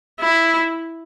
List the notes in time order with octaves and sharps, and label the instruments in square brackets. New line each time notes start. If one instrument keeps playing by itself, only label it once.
[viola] E4